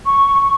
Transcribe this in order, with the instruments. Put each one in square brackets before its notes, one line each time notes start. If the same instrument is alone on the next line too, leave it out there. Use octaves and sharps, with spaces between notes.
[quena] C#6